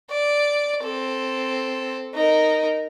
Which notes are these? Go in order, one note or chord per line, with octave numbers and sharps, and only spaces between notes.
D5
C4 A4
D#4 A#4